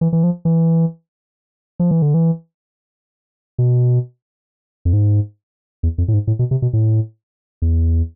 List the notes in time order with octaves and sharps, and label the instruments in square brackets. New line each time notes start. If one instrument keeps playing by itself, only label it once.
[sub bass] E3
E3
F3
E3
F3
E3
D3
E3
B2
F2
G#2
E2
F2
A2
G#2
A2
B2
C3
B2
A2
E2